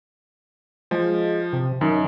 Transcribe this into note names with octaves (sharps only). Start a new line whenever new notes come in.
F3 G#3
C3
F#2 D#3